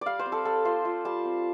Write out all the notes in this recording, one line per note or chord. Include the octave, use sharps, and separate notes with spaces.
G3 D5 F5
C5
C4
A4
G3 A4
F4 C5
F4
G3 A5
C4